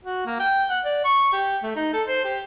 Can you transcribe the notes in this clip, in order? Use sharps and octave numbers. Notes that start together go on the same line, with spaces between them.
F#4
A#3
G5
F#5
D5
C#6
G4
A3
D#4
A4
C5
G4